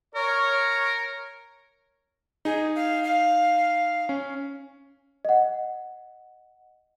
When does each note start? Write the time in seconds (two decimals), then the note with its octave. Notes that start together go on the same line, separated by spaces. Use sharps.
0.15 A#4 C#5
2.45 D#4 G#4
2.75 F5
3.04 F5
4.09 C#4
5.25 D#5 F#5